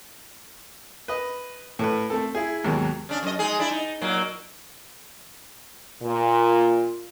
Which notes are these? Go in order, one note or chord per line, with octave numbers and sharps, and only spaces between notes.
B4 D#5
A2 A4 B4
A3 C4 A4
E4 G#4
D#2 G#2 B2 D#3 F#3
C#3 D4
F#2 D#5
G#3 D#4 G#4
D4 E4
D#4
A#2 F#3 A#3
A#2